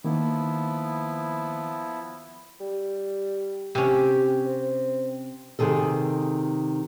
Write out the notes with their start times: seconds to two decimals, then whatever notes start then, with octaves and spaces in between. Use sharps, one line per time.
0.04 D#3 F3 A#3 B3 E4
2.60 G3
3.75 C3 C#4 G4
4.45 C4
5.59 C3 D#3 G#4 A4